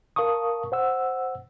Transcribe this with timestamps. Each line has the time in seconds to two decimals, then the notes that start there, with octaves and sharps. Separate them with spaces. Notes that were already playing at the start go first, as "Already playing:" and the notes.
0.16 A#4 F5 A5 C#6 D#6
0.72 C5 F#5 E6